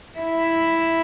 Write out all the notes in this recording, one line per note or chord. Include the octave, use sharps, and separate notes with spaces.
E4